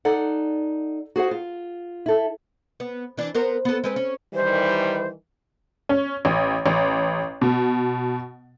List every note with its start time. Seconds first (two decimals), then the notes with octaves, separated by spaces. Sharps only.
0.05 D#4 A4 D5 F#5
1.16 F#4 G#4 C5 F#5
1.31 F4
2.06 E4 A4
2.80 B3
3.17 E3 D4
3.34 B3 A#4 C5
3.65 B3 A4
3.84 G#3 C4 B4
3.96 C#4
4.34 D#3 E3 G3 C5
5.89 C#4
6.25 A1
6.66 A1
7.41 B2